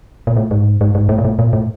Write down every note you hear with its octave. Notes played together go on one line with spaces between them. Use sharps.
A#2
A2
G#2
G#2
G#2
A2
A#2
A2
A#2
A2